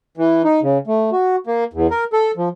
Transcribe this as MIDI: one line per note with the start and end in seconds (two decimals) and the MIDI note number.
0.17 0.42 52
0.44 0.60 63
0.62 0.78 49
0.87 1.10 57
1.12 1.36 66
1.47 1.64 58
1.73 1.87 40
1.91 2.04 70
2.13 2.31 69
2.37 2.49 53